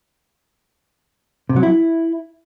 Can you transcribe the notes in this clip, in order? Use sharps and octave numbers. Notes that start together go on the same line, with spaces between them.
C3
F#3
E4